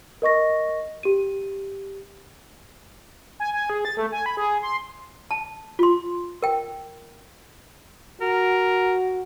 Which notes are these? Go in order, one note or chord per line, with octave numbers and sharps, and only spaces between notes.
A#4 D#5 C#6 A#6
G4 D#7
G#5
G#5
G#4
A6
A3
G#5
B5
G#4
C6
A5
F4 C6
A#4 G5
F#4 A#4